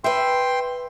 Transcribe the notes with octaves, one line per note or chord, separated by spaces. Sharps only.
B4 E5 G5 C6